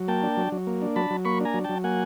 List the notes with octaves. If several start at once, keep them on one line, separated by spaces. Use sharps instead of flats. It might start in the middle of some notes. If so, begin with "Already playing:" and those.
Already playing: F#3
A#3 G5 A5
D4
F#3
F#3
A#3
D4
F#3 A5 B5
F#3
A#3 B5 C#6
D4 G#5 A#5
F#3
F#3 G5 A5
A#3 F#5 G#5